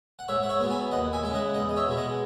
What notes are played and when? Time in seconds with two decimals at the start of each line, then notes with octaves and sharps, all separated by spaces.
0.19 F#5
0.28 G#2 C#5 E5
0.43 F#5
0.49 C#5 E5
0.60 F#3 B3
0.70 E5 G#5
0.92 D#2 D#5 F#5
1.13 E5 G#5
1.23 C#3 G#3 E5
1.34 D#5 F#5
1.55 E2 D#5 F#5
1.69 D#5
1.76 C#5 E5
1.86 B2 G#3
1.97 D#5 F#5